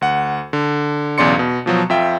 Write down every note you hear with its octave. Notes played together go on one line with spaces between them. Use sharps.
D2 F#5
D3
B1 E2 C#3 D5 C6 C#7
B2
B2 F3 F#3
F2 F4 E5 G5